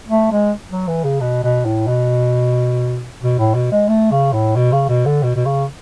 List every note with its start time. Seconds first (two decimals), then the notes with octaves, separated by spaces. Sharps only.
0.08 A3
0.32 G#3
0.71 F#3
0.87 E3
1.04 C#3
1.20 B2
1.43 B2
1.65 A2
1.87 B2
3.22 B2
3.38 A2
3.55 B2
3.72 G#3
3.88 A3
4.11 C#3
4.33 A2
4.56 B2
4.72 C#3
4.89 B2
5.06 D3
5.23 B2
5.36 B2
5.45 C#3